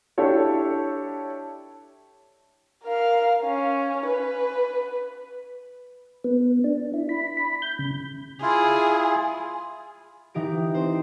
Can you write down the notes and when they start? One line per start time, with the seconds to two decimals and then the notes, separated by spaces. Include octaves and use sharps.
0.18 D4 E4 G4 A4 C#5
2.84 A#4 F5
3.43 C#4
4.07 B4
6.24 B3
6.64 D4
6.94 E4
7.09 B5
7.37 B5
7.62 G6
7.79 C#3
8.42 E4 F4 G#4
10.34 E3 D#4 G4 D7
10.74 C4 C5